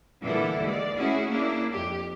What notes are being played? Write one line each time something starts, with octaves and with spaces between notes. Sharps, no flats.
A#2 D3 E3 G3 E4 A4
D#2 G#3 D5
A3 C#4 E4 F#4 G#4
A#3 C#4 D4 E4
F2 G4